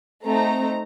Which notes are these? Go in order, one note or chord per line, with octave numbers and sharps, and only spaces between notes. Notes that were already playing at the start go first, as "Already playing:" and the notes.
A3 C4 D#4 A#5